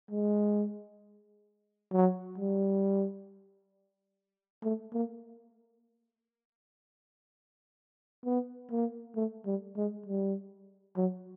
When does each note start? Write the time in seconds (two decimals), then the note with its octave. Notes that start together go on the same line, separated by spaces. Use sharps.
0.11 G#3
1.93 F#3
2.38 G3
4.64 A3
4.94 A#3
8.25 B3
8.72 A#3
9.16 A3
9.46 G3
9.77 G#3
10.06 G3
10.97 F#3